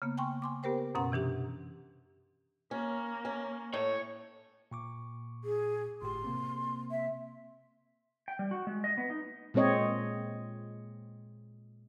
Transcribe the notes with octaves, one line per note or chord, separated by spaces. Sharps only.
C#3 A#3 B3
G5 G#5 C6 C#6
G#5 C6 D6
B3 G4 A#4 C5 G5
F#2 B2 C#4 F#5 C6
C3 E3 D4 G4
A#3 C#4
C#4
A2 C#5
A#2 C#6 D6
G#4
G1 A2 G4 C6
C3 A#3 C4
E5
G5
G3
F#4
G#3
D#5
B3
D#4
A#2 G#3 C4 C#5 D#5